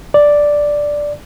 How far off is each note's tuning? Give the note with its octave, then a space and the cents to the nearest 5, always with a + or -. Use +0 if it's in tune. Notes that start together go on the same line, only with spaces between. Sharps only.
D5 +0